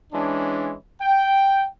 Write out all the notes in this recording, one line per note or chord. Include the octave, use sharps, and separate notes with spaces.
E3 G#3 C#4 D4
G5